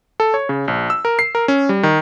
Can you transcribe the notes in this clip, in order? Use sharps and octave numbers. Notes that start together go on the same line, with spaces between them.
A4
C#5
C#3
A#1
E6
A#4
C7
A#4
C#4
G3
D#3